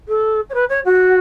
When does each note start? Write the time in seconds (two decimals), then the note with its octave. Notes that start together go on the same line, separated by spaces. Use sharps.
0.08 A4
0.49 C#5
0.54 B4
0.69 C#5
0.85 F#4